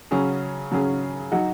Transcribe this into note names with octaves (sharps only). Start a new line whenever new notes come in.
C#3 F#3 C#4 G#4
C#3 F#3 C#4 G#4
F#3 D#4 F#4